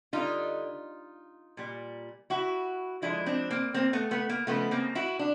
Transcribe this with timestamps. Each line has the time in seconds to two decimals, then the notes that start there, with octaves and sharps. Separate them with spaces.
0.13 D3 G3 D#4 F4
1.57 A#2 G3
2.30 E4 F#4
3.02 D3 F3 G#3 D4 E4
3.26 C4 D4
3.50 A#3 C4
3.74 A#3 C4
3.93 A3 B3
4.11 A3 B3
4.29 A#3
4.47 C#3 F3 G#3 A3 B3
4.71 A#3 C4
4.95 E4 F#4
5.19 D4